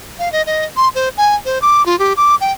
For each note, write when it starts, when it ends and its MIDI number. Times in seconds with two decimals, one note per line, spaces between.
0.19 0.31 77
0.32 0.42 75
0.46 0.65 75
0.77 0.88 84
0.95 1.09 72
1.17 1.35 80
1.45 1.59 72
1.62 1.85 86
1.86 1.98 65
1.99 2.13 67
2.17 2.35 86
2.41 2.52 79